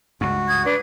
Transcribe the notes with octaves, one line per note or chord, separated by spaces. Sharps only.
C#2 G2 F#4
D#6 G#6
D4 B4